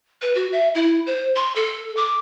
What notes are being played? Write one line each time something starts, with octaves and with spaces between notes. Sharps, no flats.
B4
F#4
E5
E4
C5
C6
A4
D6